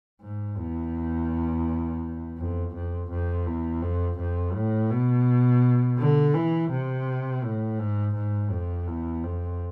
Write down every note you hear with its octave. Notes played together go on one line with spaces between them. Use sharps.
G#2
E2
F2
F2
F2
E2
F2
F2
A2
B2
D3
E3
C3
A2
G#2
G#2
F2
E2
F2